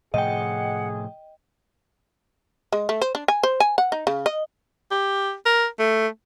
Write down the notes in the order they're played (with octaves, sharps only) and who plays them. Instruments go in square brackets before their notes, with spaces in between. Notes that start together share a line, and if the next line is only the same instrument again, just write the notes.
[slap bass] A2 C3 F3 [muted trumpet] G#4 [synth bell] D#5 G5 [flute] F#5
[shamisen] G#3
A3
C5
D4
G#5
C5
G#5
F#5
D#4
C#3
D#5
[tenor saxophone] G4
A#4
A3